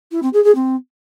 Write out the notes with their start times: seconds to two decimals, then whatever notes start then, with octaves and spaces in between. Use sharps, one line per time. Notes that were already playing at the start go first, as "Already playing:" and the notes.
0.11 E4
0.22 C4
0.33 G#4
0.44 G#4
0.55 C4